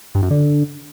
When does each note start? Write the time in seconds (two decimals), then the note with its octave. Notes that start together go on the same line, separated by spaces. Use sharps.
0.15 G2
0.23 F#2
0.31 D3